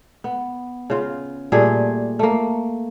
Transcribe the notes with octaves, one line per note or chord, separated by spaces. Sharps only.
B3
C#3 F4
A#2 G3 A3 G#4
A3 A#3